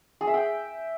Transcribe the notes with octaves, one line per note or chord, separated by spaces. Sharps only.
G#4
E5
G5